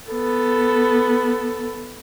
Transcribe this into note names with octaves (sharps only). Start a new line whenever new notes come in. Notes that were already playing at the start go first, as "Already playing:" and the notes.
B3 A4